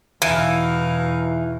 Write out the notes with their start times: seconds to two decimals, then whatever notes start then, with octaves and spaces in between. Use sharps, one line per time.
0.22 E2 B2 E3 D#4 E4 F5